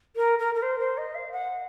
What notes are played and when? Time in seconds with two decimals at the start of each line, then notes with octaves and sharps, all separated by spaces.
0.16 A#4
0.39 A#4
0.55 A#4
0.62 C5
0.79 C5
0.98 D#5
1.15 F5
1.32 F#5